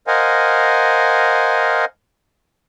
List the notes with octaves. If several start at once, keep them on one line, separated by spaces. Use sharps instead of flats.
A#4 C5 D#5 F5 F#5 G#5